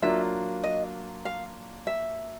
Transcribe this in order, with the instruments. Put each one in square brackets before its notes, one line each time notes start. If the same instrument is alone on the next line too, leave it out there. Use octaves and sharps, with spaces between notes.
[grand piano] F#3 A#3 D4 F4 [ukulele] E5
[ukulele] D#5
F5
E5